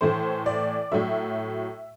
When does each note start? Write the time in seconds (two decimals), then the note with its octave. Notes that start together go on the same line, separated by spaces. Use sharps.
0.01 A2 E3 A3 C5
0.46 D5
0.92 A2 F#3 A3 E5